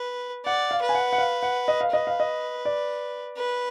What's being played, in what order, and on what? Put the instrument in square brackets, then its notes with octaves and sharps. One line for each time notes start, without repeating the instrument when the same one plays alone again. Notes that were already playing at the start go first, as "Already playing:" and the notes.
Already playing: [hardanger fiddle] B4
[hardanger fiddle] D5 [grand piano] F#5
[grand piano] F5
[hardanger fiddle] B4
[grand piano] G#5
F#5
F#5
F5
F#5
D#5
F5
[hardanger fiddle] B4 [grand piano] D#5
[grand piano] F5
D#5
D5
[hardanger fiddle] B4